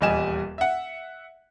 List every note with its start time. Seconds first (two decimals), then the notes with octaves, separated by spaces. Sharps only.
0.01 D#1 E2 G3 D#5 G#5 E7
0.58 E5 F#5